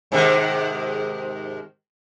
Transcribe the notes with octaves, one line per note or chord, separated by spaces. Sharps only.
G#2 C3 D#3